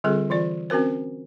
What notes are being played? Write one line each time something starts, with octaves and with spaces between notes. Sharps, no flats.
D3 G3 C4 F4 G#4 A4
E3 F4 D5
C4 C#4 F#4 A#4 C5